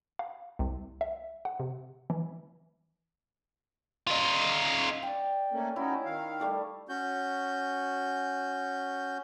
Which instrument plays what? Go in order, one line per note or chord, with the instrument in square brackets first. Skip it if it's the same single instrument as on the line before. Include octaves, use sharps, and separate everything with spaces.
[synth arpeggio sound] F5
C2
E5
F#5
C3
E3
[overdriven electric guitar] D#4 F4
[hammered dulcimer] D5 G5
[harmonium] A3 A#3 C#4
[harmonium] C#4 D#4 F#4 [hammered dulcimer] E4
[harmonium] D#3 F5
[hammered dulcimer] G3 A3 G4
[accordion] C#4 F#4 G6